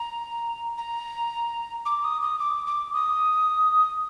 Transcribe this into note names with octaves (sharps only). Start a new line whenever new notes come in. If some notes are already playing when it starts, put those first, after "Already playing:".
Already playing: A#5
A#5
D6
D#6
D#6
D6
D6
D#6